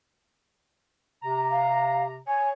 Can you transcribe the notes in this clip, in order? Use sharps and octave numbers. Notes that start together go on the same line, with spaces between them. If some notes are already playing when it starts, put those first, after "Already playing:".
C3 A#5
F5
C#5 G#5